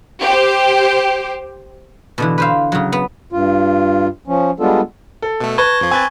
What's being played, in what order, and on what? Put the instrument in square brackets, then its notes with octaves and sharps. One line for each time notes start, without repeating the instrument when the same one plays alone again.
[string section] G4 C5
[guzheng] B2 D3 E3
B4 C5 F5
C#3 F#3
B3
[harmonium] G2 F4
F3 C#4
G3 G#3 B3 D4 F4 A4
[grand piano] A4
[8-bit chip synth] B2 A3
[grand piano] B4 [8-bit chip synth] A5 A#6 [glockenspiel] C#6 G#6 G7
[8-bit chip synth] F2 F3
[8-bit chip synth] C4 B4 [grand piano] G#5 A6